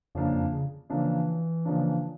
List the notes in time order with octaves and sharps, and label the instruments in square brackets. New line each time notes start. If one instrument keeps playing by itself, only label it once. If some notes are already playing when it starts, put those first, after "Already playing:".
[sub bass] F2 [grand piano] C#3 F3 A#3 D4
[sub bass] F2
C#3
[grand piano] C#3 F3 A#3 D4 [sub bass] E3
[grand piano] C#3 F3 A#3 D4